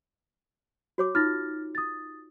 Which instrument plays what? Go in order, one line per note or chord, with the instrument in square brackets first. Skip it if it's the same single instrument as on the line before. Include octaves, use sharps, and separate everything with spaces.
[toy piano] F#4 C#5 D6
[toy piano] D#4 F4 [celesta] F6 A6 A#6
[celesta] D#6 A6